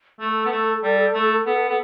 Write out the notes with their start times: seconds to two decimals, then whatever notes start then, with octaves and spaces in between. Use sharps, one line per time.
0.20 A3 A4
0.45 B3
0.52 A3
0.83 G3
1.14 A3
1.46 B3
1.69 B3